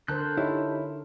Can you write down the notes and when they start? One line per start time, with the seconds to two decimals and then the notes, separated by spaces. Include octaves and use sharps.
0.08 D3 A#4 C5 A5 F#6 G6
0.37 D#4 E4 G4 C#5